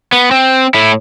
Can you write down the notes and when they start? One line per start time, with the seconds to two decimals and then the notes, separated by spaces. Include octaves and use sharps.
0.12 B3
0.31 C4
0.74 A2 E4